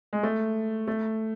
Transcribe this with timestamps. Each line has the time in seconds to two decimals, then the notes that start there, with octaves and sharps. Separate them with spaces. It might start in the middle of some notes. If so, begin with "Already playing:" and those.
0.13 G#3
0.23 A3
0.87 A3